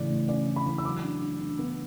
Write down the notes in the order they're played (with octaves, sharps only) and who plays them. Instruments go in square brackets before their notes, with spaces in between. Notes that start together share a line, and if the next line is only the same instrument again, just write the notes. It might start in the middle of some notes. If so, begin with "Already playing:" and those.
Already playing: [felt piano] A2 C#3 E3 D5
A2
C#4 D5
E3
B5
E3
E6
F#3 D6
D4
D4
D4
B3